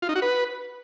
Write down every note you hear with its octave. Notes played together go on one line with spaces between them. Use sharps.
F4
D#4
F#4
B4